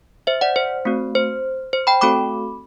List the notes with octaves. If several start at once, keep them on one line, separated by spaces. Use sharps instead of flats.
C5 E5
D5 F#5
C5
A3 C4 F#4
C5
C5
G5 B5
A3 C4 F#4 A4 B5 D6